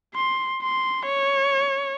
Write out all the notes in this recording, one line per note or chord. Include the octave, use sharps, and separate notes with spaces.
C6
C6
C#5